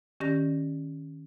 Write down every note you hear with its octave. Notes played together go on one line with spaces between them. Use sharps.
D#3 C#4 G4 D5 A#6